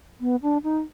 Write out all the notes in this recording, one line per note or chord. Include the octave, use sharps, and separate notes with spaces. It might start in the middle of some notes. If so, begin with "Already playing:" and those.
B3
D4
D#4